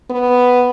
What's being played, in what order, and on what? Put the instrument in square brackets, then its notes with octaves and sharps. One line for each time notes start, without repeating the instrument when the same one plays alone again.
[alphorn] B3